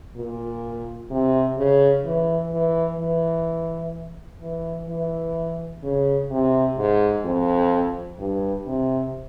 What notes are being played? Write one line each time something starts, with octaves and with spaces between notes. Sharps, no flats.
A#2
C3
C#3
E3
E3
E3
E3
E3
C#3
C3
G#2
F2
G2
C3